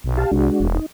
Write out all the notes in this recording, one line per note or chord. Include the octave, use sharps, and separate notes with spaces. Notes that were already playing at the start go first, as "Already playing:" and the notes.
B1
G4 F5 A5
C2 G#3 D4 F#4
E1
D#4